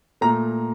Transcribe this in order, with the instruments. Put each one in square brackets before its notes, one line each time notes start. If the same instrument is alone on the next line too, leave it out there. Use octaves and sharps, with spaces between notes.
[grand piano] A#2 A3 A#5